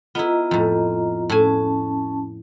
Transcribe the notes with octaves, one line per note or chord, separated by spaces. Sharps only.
B3 E4 F4 D#5 A#5
F2 A2
A2 C#4 G#5 A5